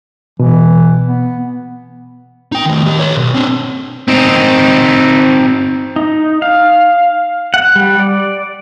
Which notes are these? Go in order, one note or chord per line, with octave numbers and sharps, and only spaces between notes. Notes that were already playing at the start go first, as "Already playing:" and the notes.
B2 E3
B3
D#4 G5
D#3 A3
D#3 G4
B4 C#5
B1
C4 D4
C4 D#4
D#4
F5
F#5
G3
D5